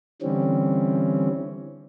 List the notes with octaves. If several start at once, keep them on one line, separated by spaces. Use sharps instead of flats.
D3 E3 G3 C4 C#4